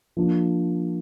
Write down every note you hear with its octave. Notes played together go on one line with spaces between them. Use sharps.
F3 A#3 D4